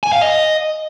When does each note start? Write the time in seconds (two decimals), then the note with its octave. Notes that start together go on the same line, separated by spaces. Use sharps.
0.03 G#5
0.12 F5
0.21 D#5